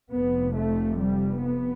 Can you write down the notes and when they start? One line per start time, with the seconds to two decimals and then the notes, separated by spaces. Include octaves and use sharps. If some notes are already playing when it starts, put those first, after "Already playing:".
0.12 F1 F2 C3 B3
0.56 A3
1.00 G3
1.44 B3